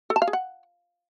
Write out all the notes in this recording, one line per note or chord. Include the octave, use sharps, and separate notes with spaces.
A4
A5
F5
G#4
F#5